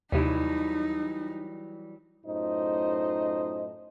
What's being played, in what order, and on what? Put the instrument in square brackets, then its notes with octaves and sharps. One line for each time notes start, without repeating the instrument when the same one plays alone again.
[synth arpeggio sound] D#2 C3 [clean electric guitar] E3 F#3 G3 [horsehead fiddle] D#4
[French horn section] F#2 A2 D#4 F4 C5 D#5